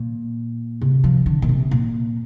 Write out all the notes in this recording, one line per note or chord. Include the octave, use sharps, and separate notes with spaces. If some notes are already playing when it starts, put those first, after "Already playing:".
Already playing: A#2
C3
F3
D3
A#2
C3
A#2